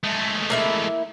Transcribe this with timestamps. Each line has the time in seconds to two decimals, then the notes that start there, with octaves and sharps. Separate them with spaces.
0.04 G#3 A3
0.50 A#3 E4 E5